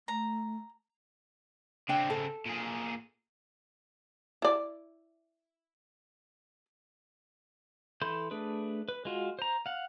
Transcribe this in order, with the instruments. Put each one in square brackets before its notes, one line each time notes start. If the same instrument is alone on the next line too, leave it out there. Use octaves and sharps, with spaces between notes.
[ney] A3 [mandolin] A#5
[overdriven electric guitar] C#3 C4 [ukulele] D4 G5
[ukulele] A4
[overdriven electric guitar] A#2 G#4
[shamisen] E4 D5
[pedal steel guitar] E3 A4 B5 C6 G6
A3 D4 G#4 B4
B4
G#3 F4 F#4
C5 A#5
F5 F#5